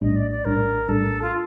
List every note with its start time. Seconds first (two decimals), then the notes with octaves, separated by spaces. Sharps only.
0.01 A#1 A2 G3 D4 D#5
0.16 D5
0.31 D5
0.45 A#1 A2 G3 D4 A#4
0.88 A#1 A2 G3 D4 A4
1.22 F4